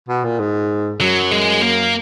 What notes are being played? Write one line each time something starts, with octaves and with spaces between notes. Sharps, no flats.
B2
A#2
G#2
F#2 F#3
G#3
A#3